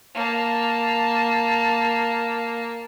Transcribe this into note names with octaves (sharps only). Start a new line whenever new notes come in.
A#3 A5